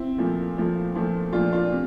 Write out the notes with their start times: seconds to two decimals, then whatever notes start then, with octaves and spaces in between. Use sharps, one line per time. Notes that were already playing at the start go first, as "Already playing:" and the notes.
Already playing: C4 E4
0.18 A#2 F3 A3
0.58 A#2 F3 A3
0.95 A#2 F3 A3
1.33 A#2 F3 A3 D4 F4
1.53 D4 F4
1.72 C3